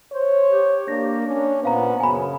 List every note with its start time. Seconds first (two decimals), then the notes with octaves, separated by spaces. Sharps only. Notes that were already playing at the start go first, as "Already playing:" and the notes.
0.12 C5 C#5
0.48 G4
0.88 A#3 D4 A#6
1.27 C#4
1.63 A#2 B3 C5 F5 A#5
2.00 F#2 C#3 G#5 B5